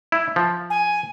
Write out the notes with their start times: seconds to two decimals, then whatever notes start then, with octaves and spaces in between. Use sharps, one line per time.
0.12 E4
0.36 F3
0.70 G#5